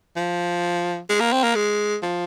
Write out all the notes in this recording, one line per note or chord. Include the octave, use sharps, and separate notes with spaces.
F3
G#3
A#3
C4
A#3
G#3
F3